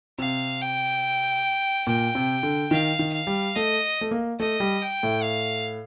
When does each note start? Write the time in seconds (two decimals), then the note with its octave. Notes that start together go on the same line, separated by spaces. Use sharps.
0.19 C3 F5
0.61 G5
1.87 A#2 G5
2.15 C3
2.43 D3
2.71 D#3 F5
2.99 D#3
3.13 F5
3.27 G3
3.56 A3 D#5
4.01 A3
4.11 A#3
4.40 A3 D#5
4.60 G3
4.81 G5
5.03 A2
5.23 F5